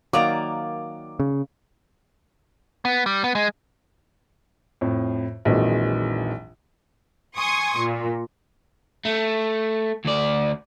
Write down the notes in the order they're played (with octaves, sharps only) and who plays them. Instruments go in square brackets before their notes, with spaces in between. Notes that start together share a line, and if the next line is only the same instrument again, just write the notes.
[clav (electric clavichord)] D#3 F#3 [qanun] A#3 D5 A#5 [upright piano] D6 D7
[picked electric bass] C#3
[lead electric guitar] B3
G3
B3
G#3
[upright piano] F2 A2
A#1 F2 D#3 E3 F#3 G#3
[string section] G#5 C6 C#6 D#6 G#6
A#2
[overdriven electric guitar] A3
D2 D5